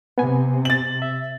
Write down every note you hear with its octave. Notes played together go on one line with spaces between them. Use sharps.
C3 B3 G#5
A6 F#7
E5